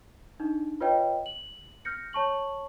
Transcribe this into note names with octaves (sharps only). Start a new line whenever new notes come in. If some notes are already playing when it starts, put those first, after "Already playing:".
D4 D#4
F4 B4 C#5 D#5 G5
F#7
F6 G6 A#6 C#7
C#5 A5 C#6 F#7